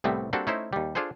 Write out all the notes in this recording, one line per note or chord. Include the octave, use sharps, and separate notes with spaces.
C2 A2 G3 A3 B3 C4
G3 A#3 C4 D4 F#4 A4
A3 C#4 D#4 E4 C5
D#2 G3
D4 F4 G#4 A4 C5